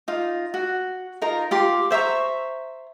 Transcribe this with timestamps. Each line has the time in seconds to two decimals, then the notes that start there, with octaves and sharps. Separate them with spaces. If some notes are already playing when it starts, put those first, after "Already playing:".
0.08 D#4 F4
0.54 F#4
1.22 D#4 F4 A#4 A#5
1.51 F4 G4 C6
1.91 C5 E5 A#5 C#6